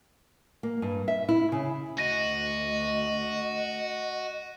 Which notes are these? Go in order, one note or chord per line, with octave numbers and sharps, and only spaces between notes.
A#3
G2
E5
E4
C#3
D2 F#4 D#5 A#6 D#7